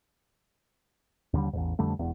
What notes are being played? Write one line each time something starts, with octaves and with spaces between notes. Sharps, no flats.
D#2 D3 G3
A1 E2 G#2
F2 D3 G3 A3
E1 E2